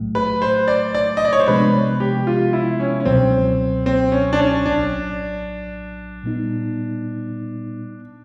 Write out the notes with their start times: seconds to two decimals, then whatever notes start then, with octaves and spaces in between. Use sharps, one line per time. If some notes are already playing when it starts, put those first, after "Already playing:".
Already playing: B1 A2 F#3 A3
0.15 B4
0.42 C5
0.68 D5
0.95 D5
1.17 D#5
1.25 D5
1.33 C#5
1.40 C5
1.48 C3 F3 G#3 B3 D4 B4
2.00 G4
2.27 F4
2.53 E4
2.80 C#4
3.00 C#4
3.05 C#2 B2 F#3 C4
3.86 C4
4.12 C#4
4.33 D4
4.39 C#4
4.65 A#1 A2 F#3 D4
6.23 A#2 G3 B3 D#4